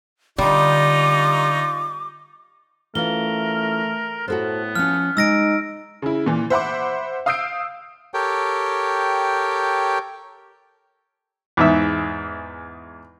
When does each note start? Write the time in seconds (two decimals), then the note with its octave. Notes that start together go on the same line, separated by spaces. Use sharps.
0.38 D3 G3 D#4 F4 D6
2.95 E3 A3 C#4 F4 A#4 G7
4.28 A2 B3 F#4 A4 C5
4.75 F3 C#4 F6
5.17 G#3 D#4 E6 A#6 D7
6.02 C#3 E4
6.26 A#2 E3
6.50 C5 E5 F#5 B5 C6 D6
7.26 F5 D#6 E6 G6 C7 D7
8.14 G4 A4 A#4 C#5 G5
11.57 E2 G#2 E5